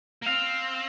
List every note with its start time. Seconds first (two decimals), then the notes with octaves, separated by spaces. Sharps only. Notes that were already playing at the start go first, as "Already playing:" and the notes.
0.22 A#3
0.26 C4 F5